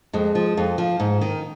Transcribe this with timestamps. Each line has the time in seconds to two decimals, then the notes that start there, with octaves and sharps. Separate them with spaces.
0.13 F2 G#3
0.35 F3
0.57 F2
0.78 F3
1.00 G#2
1.21 D#3